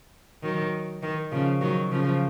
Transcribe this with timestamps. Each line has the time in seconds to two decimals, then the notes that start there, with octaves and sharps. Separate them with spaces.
0.42 D#3 F#3
1.02 D#3
1.32 C#3 F3
1.61 D#3 F#3
1.91 C#3 F3